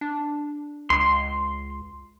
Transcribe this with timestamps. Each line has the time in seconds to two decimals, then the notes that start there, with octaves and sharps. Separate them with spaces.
0.01 D4
0.90 C#2 C6